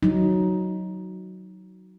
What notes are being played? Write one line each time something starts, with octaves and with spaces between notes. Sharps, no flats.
F#3 D#4